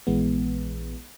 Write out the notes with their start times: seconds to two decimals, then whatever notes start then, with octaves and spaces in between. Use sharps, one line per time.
0.07 A#1 E3 G#3 B3